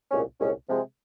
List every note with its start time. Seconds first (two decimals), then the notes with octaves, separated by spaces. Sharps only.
0.11 C2 A#2 G#3 C#4
0.39 C2 A#2 G#3 C#4
0.68 C3 F3 G#3